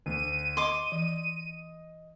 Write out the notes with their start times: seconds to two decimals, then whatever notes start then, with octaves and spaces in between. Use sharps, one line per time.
0.06 D2 D#7
0.57 D#5 C6 D6
0.92 E3